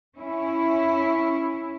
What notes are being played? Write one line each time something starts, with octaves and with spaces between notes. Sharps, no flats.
C#4 E4